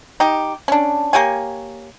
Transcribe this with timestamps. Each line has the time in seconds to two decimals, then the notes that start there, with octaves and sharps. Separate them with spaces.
0.20 D#4 G4
0.68 C#4 D4
1.13 A#3 G4 C#5 G#5